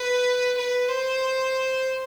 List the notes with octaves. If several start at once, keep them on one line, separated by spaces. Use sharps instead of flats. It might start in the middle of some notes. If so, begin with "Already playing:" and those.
Already playing: B4
B4
C5